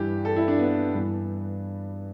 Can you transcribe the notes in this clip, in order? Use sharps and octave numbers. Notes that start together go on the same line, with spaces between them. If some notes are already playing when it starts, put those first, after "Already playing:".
Already playing: G2 E3 G4
A4
E4
D4
B3
G2 E3